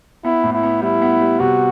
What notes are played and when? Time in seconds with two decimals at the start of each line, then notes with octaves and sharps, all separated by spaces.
0.24 B3 E4
0.44 A2
0.54 E4
0.63 B3
0.82 G3 E4
1.02 B3
1.21 G3
1.40 C3 F#4